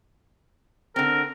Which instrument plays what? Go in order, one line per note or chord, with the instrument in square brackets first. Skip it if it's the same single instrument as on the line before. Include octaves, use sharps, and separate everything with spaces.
[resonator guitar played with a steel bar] D3 C4 [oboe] A#4